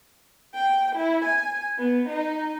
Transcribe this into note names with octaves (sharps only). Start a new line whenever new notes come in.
G5
E4
G#5
B3
D#4